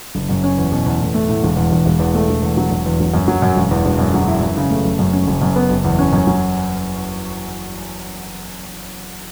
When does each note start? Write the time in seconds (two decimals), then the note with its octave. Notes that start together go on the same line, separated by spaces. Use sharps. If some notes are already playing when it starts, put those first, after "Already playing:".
0.15 F#1
0.29 F#2
0.43 C#4
0.58 E2
0.72 B2
0.86 E2
1.01 A2
1.14 A3
1.28 A2
1.43 E1
1.57 E2
1.72 E1
1.86 E1
2.00 E2
2.15 A3
2.29 E1
2.42 E2
2.57 F#3
2.71 E1
2.86 E2
3.00 F#3
3.14 F#2
3.28 F#3
3.42 F#2
3.56 E1
3.71 E2
3.85 E1
3.99 F#2
4.14 F#3
4.28 E4
4.41 F#2
4.57 C#3
4.70 A3
4.85 F#1
4.99 F#2
5.13 C#4
5.27 F#1
5.42 F#2
5.56 B3
5.70 F#1
5.85 E2
5.98 C#4
6.13 F#2
6.27 F#3